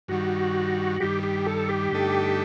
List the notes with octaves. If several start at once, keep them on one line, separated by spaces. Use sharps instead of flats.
G2 D#3 G3 F#4
G2 D#3 G3 G4
G4
A4
G4
G2 D3 A3 D#4 A4